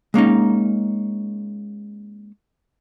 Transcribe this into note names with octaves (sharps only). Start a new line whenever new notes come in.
G#3 A#3 C#4 D#4